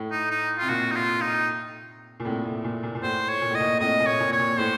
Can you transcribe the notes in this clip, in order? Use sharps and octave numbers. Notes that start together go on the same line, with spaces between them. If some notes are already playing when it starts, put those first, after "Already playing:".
Already playing: A2
D#4
D#4
C3 F4
A#2 F#4
D#4
F4
D#4
A#2
A2 C3
A2 C3
A#2
A#2
A#2
A2 C5
C#5
A#2
A2
D#5
A#2
A2 C3 D#5
A#2
C#5
A#2
C#5
A#2
A2 C5